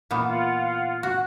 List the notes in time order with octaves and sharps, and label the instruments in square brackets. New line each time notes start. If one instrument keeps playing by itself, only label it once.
[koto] A#2 E3 B3
[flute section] F4 F#5
[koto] F#4 [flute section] F#6